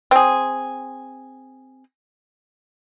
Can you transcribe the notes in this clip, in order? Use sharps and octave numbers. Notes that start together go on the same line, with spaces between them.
C4 G#4